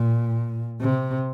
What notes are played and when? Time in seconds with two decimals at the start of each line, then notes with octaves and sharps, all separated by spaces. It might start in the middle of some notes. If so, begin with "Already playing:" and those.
Already playing: A#2
0.81 C3